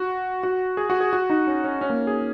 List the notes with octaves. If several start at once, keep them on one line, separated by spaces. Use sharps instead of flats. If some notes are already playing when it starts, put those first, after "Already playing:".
Already playing: F#4
F#4
G#4
F#4
G#4
F#4
D#4
C#4
C#4
C#4
A#3
G#4